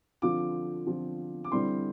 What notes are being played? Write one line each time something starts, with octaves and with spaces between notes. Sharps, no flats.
D3 F3 C4 F4 D6
D3 F3 C4 F4
D6
D3 G3 C4 E4 C6